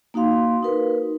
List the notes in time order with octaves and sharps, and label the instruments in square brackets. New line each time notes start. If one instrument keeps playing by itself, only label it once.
[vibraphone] A#3 D#4 F#4 F5 C6
D#4 F#4 A#4 B4